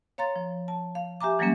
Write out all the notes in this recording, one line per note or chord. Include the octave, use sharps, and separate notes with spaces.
C#5 F5 A#5 C6 A6
F3
A5
F5
G4 E5 G#5 A#5 D6
E3 F#3 G3 A#3 C#4